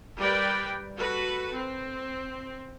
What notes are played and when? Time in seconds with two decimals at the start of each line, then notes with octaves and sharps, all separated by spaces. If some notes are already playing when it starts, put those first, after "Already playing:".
0.17 G3 A#4 B4 D5 G5
0.97 F#4 A4 B4
1.55 C4